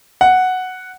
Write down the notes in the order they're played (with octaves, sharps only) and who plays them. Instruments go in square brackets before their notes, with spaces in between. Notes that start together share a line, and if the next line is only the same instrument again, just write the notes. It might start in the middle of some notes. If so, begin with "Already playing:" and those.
[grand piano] F#5